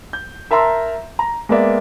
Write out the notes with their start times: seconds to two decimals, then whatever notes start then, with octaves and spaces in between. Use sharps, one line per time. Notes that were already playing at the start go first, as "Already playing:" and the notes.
0.13 G6
0.51 A#4 E5 A5 A#5 C6 E6
1.19 A#5
1.49 G#3 A#3 B3 A#4 D5 E5